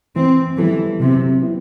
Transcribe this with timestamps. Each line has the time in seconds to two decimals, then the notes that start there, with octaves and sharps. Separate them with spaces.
0.16 E3 C4
0.58 E3 G3 B3 E4 A4
1.00 C3 F#3
1.43 B3 E4